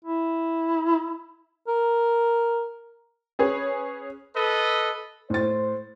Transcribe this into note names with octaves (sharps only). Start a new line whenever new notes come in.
E4
A#4
C#4 G#4 B4 C#5
A4 B4 D#5
A2 C5 A6